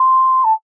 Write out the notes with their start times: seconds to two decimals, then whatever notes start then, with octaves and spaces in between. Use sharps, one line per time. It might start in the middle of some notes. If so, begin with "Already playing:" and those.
Already playing: C6
0.44 A5